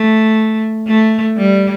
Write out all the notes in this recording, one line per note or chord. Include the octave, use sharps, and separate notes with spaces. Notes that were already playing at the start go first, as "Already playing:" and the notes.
Already playing: A3
A3
G3